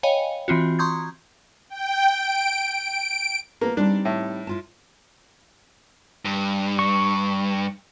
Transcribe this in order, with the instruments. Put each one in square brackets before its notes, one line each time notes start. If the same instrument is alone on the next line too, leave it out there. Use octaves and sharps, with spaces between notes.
[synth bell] C#5 D#5 F5 G5 G#5 B5
E3 C4 F4 F#4
A#5 C6 C#6 D#6 G6 G#6
[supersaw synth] G5
D7
D7
[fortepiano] A#3 [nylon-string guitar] B3 F4 B4
[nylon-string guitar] G3 C4 D#4 [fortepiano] D4
[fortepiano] A2
[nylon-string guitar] E4 F4 A5
[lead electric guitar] G2
[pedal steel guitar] C#6